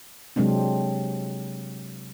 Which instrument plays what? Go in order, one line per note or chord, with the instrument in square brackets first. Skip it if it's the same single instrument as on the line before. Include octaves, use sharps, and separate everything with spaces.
[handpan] C3 F#3 G#3 C4 D4